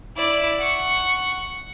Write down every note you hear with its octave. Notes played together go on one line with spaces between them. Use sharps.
E4 D5
F#5 C#6